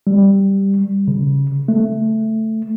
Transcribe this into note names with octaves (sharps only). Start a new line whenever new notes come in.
G3
C#3
A3